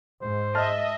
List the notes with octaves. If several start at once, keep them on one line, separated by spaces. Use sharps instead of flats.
G#2 C5
D#5 E5 A5 F6